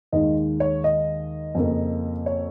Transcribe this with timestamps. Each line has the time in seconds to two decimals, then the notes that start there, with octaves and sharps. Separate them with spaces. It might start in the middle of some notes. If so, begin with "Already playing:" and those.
0.12 D#2 D#3 G#3 D#5
0.60 C#5
0.84 D#5
1.55 F2 C#3 A#3
2.26 C#5